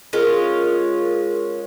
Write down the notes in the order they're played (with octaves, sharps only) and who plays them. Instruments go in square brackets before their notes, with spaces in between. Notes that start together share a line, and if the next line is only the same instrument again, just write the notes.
[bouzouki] G#3 C#4 F4 [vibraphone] A#4